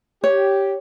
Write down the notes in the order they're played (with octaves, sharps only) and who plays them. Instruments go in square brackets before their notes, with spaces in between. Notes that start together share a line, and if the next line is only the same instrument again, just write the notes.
[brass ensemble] G4 [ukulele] C#5